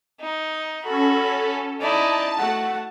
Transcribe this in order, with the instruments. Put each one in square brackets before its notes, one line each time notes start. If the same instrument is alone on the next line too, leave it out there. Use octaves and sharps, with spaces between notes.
[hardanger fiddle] D#4
[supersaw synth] C#4 A4 [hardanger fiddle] F#4 B5
[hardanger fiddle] D#4 E4 [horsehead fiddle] D5 [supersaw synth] A5
[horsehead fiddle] A3 F#5 [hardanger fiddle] F#4